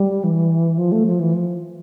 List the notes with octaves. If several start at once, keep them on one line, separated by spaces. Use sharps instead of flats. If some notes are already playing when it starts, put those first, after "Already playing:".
Already playing: G3
E3
F3
A3
F3
E3
F3